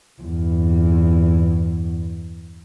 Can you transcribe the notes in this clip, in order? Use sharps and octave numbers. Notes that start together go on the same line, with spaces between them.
E2 G2